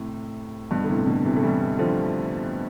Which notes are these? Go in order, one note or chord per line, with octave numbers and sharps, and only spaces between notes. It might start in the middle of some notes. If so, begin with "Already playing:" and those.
Already playing: A2 C3
G2 B2
D3
A2 C3
B2 D3
C3 E3
A3
E3 G3
D3 F3